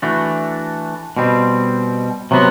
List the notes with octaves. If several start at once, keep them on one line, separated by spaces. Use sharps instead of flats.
E3 A3 D4 F#4
B2 G3 C4
C3 F#3 B3 F#4